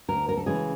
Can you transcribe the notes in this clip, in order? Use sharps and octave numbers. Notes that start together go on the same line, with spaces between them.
D2 A#4
A#4
A4
C#3 E3 G#3 C#4 G#4